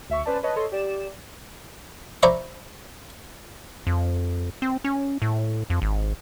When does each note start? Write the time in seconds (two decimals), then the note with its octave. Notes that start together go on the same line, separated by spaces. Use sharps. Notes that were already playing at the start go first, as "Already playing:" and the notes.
0.09 D2 E5 C#6
0.25 C#4 B4 C5 D5 A5
0.43 B4 C#5 D#5 A5
0.56 A4 C#5 D#5 C6
0.72 G4 D5 E7
2.23 C5 D5 E5 A#5 B5 C#6
3.87 F2
4.62 C4
4.84 C#4
5.22 A2
5.70 F2
5.82 G#1